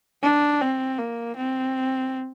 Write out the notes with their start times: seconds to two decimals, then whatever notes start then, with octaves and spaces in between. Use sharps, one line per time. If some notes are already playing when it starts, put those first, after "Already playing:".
0.23 D4
0.61 C4
0.98 A#3
1.37 C4